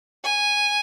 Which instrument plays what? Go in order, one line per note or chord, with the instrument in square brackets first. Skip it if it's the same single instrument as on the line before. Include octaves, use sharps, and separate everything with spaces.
[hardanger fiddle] G#5